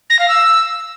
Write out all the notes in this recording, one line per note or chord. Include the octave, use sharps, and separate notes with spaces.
A#6
F5
E6